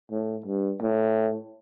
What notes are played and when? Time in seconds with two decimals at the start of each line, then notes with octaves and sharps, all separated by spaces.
0.11 A2
0.46 G2
0.82 A2